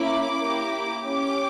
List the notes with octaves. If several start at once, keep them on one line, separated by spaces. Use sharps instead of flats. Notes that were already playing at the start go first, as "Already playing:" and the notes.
Already playing: A#3 C#4 E4 D6
A#3 E4 G4
C#4 G4 D6